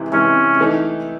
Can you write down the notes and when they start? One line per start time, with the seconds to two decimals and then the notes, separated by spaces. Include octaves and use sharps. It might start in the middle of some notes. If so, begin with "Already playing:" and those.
Already playing: C3 E3 G#3
0.12 C3 E3 G#3 C#4
0.60 E3 A3 D#4